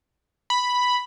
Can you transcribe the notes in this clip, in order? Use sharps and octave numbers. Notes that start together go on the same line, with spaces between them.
B5